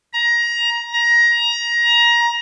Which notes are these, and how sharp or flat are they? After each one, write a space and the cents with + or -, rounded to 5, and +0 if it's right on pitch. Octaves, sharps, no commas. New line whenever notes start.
A#5 +20
A#5 +20